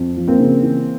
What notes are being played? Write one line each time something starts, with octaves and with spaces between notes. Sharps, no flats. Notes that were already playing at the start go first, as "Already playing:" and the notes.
Already playing: F2
F3
A#3 C4
C#3
E3